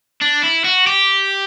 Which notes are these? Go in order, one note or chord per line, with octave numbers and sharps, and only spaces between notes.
D4
E4
F#4
G4